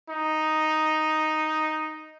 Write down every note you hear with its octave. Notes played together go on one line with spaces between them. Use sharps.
D#4